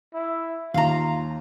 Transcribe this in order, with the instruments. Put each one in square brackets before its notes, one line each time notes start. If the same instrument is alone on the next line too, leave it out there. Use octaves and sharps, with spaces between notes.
[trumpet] E4
[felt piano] D#2 [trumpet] F4 [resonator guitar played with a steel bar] F5 A#5